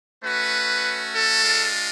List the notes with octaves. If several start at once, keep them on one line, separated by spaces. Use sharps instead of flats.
A3 C#4 F#4 B4
A4
G#3 D4 F4